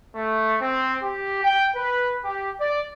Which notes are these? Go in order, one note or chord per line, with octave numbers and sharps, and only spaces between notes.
A3
C4
G4
G5
B4
G4
D5